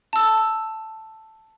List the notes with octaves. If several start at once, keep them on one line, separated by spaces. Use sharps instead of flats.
A5 E6